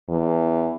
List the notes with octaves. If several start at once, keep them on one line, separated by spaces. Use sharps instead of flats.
E2